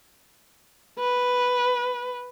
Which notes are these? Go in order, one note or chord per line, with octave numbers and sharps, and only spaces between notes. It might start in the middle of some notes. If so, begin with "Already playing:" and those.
B4